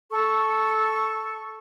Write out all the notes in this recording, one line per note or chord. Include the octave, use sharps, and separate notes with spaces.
A4 C#6